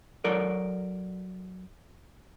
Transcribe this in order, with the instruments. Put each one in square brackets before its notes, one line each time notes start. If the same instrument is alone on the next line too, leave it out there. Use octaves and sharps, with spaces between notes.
[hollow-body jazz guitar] F#3 A4 A#4 D5